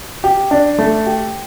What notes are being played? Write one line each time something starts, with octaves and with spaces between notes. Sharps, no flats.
G4
D4
A3
G4